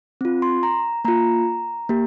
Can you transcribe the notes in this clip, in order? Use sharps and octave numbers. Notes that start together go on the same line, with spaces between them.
C4 F4
C6
A#5
A#3 F4 A#5
A#3 G4